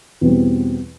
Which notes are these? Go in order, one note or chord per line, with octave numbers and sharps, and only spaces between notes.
E2 B2 G3 C4